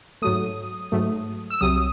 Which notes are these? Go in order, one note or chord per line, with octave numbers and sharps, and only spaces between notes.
G#2 F#3 A3 D#6
G#2 F#3 A3
E6
C2 C3 F#3 D#6